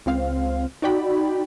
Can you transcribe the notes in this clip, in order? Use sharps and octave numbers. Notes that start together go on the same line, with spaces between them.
C#2 C4 F5
D#4 F#4 D5 G5 B5